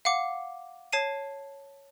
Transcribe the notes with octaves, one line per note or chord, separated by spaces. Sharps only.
F5 F#5 D6
C#5 A5 C7 D#7